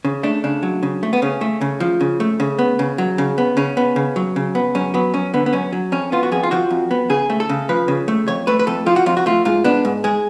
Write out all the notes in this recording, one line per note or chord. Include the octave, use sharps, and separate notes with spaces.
C#3
A3 D4
C#3 D4
F#3
C#3
A3
B3
C#3 C#4
A3
C#3
F3
C#3
A3
C#3
B3
C#3
F#3
C#3
B3
C#3 C#4
B3
C#3
F#3
C#3
B3
F#2 C#4
F#3 B3
F#2 C#4
D3 B3
B3
F#2 C#4
F#3
F2 C#4
B3 F4
F#4
F2 G#4
F4
F3 F#4
F2
B3
C#3 G#4
A3
A4
C#3
F3 B4
C#3
A3
F2 C#5
A3 B4
B4
F2 A4
F3 F4
F#4
F2 F4
F#4
A3 F4
G#2 F4
B3 D4
G#2
G#3 G#4